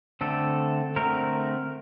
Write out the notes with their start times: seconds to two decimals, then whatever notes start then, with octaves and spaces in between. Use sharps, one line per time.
0.21 D3 A3 C4 A4
0.96 D3 A3 C4 A#4